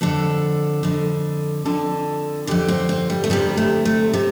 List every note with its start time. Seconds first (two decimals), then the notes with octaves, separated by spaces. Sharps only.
0.01 F2 D3 A4
0.83 F2 D3
1.65 F2 D3 A4
2.47 F2 D3 G4
2.68 C4
2.89 C4
3.10 G3
3.24 A3
3.30 D2 C3 G3
3.57 A3
3.85 A3
4.13 C3